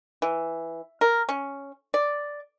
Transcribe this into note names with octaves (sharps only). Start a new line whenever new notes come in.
E3
A#4
C#4
D5